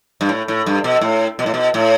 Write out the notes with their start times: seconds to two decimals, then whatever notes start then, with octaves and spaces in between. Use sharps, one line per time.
0.21 G2
0.29 A2
0.48 A2
0.66 G2
0.84 B2
1.01 A2
1.39 B2
1.46 A2
1.54 B2
1.74 A2